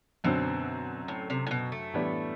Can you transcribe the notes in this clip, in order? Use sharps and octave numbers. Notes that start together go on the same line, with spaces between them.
F#2 B2 D3 F#3 C4
A2
C3
A2
B2
A3
A2 E3 G3 B3 D4